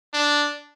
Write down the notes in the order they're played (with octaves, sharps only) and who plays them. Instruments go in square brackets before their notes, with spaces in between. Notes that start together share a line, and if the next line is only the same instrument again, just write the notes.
[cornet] D4